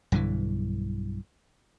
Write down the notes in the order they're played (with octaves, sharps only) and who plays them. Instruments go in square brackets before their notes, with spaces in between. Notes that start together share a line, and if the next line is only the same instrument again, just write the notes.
[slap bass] B1 G2 D3 E3